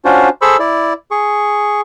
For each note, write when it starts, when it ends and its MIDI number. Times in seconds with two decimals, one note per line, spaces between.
0.05 0.29 61
0.05 0.29 62
0.05 0.29 65
0.05 0.29 66
0.05 0.29 72
0.42 0.57 68
0.42 0.57 69
0.42 0.57 72
0.42 0.57 83
0.42 0.57 85
0.42 0.57 88
0.59 0.93 64
0.59 0.93 74
1.11 1.81 68
1.11 1.81 85